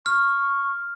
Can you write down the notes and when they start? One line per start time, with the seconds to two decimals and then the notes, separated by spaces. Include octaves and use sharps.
0.06 C#6 F6